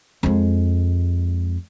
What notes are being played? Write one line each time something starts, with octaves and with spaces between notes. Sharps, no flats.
F2 G#3